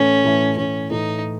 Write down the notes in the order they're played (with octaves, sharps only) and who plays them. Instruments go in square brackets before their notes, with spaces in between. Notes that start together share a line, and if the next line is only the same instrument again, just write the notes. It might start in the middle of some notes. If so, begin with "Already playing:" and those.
Already playing: [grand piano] A2 E3 A3 E4 [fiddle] C#4
[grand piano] A2 E3 A3 E4
[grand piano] A2 E3 A3 E4 [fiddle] C#4
[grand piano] A2 E3 A3 E4 [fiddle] D#4